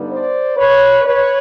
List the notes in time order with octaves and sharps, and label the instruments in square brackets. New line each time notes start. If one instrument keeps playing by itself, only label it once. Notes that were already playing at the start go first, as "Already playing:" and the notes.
Already playing: [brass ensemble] G2 D3 G3 B3 D#4
C5 D5
B4 C#5
B4 C#5